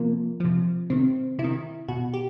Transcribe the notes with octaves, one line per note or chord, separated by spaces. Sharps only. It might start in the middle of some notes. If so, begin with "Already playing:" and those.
Already playing: C3 F3 A#3
C3 F3
C3 D#3 C4
C3 E4
D#3
B2 F#4
G4